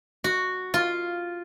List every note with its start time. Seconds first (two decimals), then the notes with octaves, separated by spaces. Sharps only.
0.24 F#4
0.74 F4